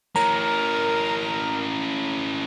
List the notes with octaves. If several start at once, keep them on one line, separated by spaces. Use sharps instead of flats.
C#4 E4 A#4 A#5